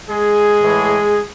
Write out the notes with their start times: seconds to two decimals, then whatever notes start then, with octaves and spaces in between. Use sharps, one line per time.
0.10 G#3 G#4
0.61 A2 E3